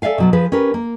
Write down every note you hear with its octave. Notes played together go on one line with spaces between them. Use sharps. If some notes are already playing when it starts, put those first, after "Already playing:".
A4 D5 E5 F5 G#5
B2 F#3 B3
F3 G#4 B4
C#4 G4 A#4 B4
A#3